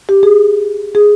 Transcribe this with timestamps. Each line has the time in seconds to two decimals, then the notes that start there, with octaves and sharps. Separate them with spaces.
0.09 G4
0.23 G#4
0.95 G#4